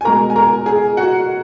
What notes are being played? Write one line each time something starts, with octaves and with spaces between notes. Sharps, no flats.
G#5
B2 G#3 A#4 A#5
G#5
A#4 A#5
G#4 G#5
F#4 F#5